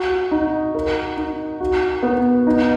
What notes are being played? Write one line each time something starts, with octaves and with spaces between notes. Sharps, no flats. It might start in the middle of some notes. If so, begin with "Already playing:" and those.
Already playing: F#4
D#4
A#4
D#4
F#4
B3
D#4